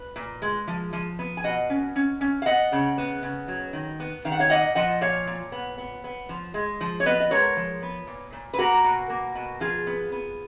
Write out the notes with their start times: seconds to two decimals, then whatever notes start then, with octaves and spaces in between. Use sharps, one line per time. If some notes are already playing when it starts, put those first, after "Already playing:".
Already playing: B4
0.16 A#2
0.42 G#3
0.68 F3
0.93 F3
1.19 B3
1.37 G#5
1.44 B2 D#5 F#5
1.70 C#4
1.96 C#4
2.21 C#4
2.42 F5
2.46 B3 D#5 F#5
2.72 C#3
2.98 B3
3.23 C#3
3.48 F#3
3.73 D#3
4.00 B3
4.25 D#3 F5
4.32 F#5
4.39 C#5 F5
4.50 A#2 D#5 F#5
4.75 F3 D#5 F#5
5.01 A#2 C#5 F5
5.27 A#2
5.52 B3
5.78 B3
6.04 B3
6.29 F3
6.54 G#3
6.81 F3
7.00 C#5
7.06 B3 B4 D#5
7.20 D#5
7.31 G#3 A#4 C#5
7.57 F3
7.82 B3
8.07 A#2
8.33 A#2
8.54 B4
8.58 A#3 F#4 A#4
8.85 B2
9.10 A#3
9.35 B2
9.60 F3 F4 G#4
9.87 B3
10.12 B3